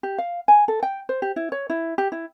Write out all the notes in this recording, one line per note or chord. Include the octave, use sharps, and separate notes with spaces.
G4
F5
G#5
A4
G5
C5
G4
E4
C#5
E4
G4
E4